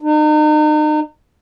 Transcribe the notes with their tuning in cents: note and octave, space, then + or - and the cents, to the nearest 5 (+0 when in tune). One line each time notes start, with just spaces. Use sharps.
D#4 -35